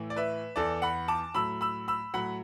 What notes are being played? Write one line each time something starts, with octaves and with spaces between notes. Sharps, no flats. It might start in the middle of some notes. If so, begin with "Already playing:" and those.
Already playing: A2 E3
D5
B4 E5
E2 E3 A4 D5
F#5 B5
A5 D6
A2 F#3 B5 E6
B5 E6
B5 E6
A2 F#3 F#5 B5